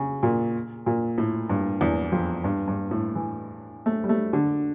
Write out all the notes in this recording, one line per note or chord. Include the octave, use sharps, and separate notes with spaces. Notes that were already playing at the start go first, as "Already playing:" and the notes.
Already playing: C#3
A#2
A#2
A2
G2
E2
F2
G2
G2
A2
E3
A3
G3
A3
D3